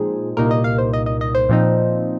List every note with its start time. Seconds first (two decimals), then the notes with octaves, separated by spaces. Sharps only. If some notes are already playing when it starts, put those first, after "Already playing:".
Already playing: A#2 F3 G#3 C4 D#4 G#4
0.37 C2 A#2 A#3 D#4 A#4
0.51 D#5
0.64 F5
0.78 C5
0.93 D#5
1.06 D#5
1.21 D#5
1.35 C5
1.49 A#2 F3 C4 D#4